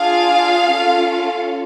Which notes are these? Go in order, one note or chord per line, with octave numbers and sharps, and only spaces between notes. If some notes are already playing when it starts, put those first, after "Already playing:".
Already playing: D4 F4 G#4 F5
C#4 F4 A4